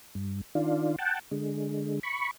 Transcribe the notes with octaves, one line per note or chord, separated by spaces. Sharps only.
G2
D#3 D4 F4
F#5 G5 A5
D3 G#3
B5 C#6